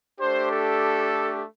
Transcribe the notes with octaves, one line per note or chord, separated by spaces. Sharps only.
A3 D4 G4 C5
A4